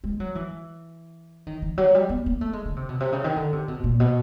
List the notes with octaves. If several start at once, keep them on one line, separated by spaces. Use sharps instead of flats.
G#3
F#3
E3
D#3
E3
F#3
G3
B3
A#3
A3
G#3
D3
C3
B2
C3
C#3
D#3
D3
C3
B2
A#2
B2